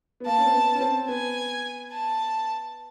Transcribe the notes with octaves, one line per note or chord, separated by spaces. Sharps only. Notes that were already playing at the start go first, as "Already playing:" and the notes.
B3
A#3 A5
C#4
C4
B3
C#4
C4
B3 G#5
A5